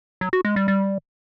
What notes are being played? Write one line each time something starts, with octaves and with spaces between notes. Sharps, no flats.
F#3
F#4
G#3
G3
G3